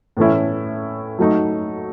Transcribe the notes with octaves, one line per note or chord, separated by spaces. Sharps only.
A2 E3 A3 C#4 E4
F#3 A3 D#4